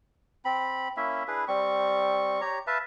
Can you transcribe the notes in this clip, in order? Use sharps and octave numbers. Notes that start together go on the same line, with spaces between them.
C4 B5
A#3 C#4 E4 E5
D4 E4 G#4 B4
G3 C4 C#6
G4 C#5 A#5
B4 E5 F5 A5